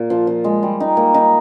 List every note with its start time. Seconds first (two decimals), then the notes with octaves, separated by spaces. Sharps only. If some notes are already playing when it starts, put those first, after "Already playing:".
Already playing: A#2
0.10 F3
0.27 F3
0.44 G#3
0.63 G3
0.80 D#4
0.97 A#3
1.14 D#4